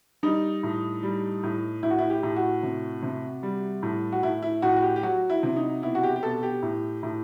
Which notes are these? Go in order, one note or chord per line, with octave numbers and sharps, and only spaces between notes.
G3 D#4
A2
G3
A2
A2 E4
F#4
E4
G4
A2
F#4
C3
C3
G3
A2
F#4
A2 E4
E4
A2 F#4
F#4
G4
G4
F#3 F#4
E4
C3
D#4
B2 E4
F#4
G4
G4
B2 A4
G4
A2
A2